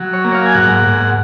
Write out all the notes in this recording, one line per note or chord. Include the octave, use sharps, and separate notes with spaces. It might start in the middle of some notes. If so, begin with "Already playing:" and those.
Already playing: F#3
C#5
A#3
F5
G#5
G#2 F#5
G#2